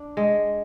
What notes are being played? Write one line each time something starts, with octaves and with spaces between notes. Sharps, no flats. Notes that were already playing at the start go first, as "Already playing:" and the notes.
Already playing: D4
G#3